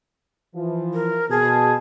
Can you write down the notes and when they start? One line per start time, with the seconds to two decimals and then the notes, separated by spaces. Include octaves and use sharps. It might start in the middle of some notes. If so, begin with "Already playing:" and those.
0.56 E3 F3
0.94 A#4
1.30 B2 G#4 A5